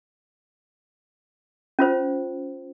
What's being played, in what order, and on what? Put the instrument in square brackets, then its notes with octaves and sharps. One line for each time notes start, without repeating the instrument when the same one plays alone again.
[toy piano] C#4 F4 C5